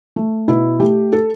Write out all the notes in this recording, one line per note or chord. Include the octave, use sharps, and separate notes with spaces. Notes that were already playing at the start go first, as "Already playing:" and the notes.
A3
B2 E4
A3 G4
A4